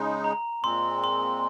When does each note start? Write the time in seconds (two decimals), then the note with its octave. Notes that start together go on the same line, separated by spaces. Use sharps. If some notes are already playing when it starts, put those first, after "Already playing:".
Already playing: C#3 G#3 D#4
0.24 A#5
0.64 A#2 G#3 C4 C6
1.04 C6